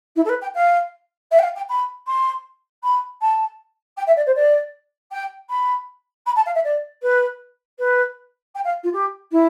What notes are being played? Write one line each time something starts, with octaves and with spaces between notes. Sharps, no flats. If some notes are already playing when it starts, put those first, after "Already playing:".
E4
A4
B4
G5
F5
E5
G5
F5
G5
B5
C6
B5
A5
G5
E5
D5
C5
D5
G5
B5
B5
A5
F5
E5
D5
B4
B4
G5
F5
F4
G4
E4